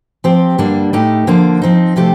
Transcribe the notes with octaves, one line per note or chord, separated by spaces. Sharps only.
F3 C4 G4
G2 D3 G3 A#3 D4
A2 A3 D#4 G4
D3 F3 A#3 D4
F3 C4 D#4
C3 F3 A3 D4 G4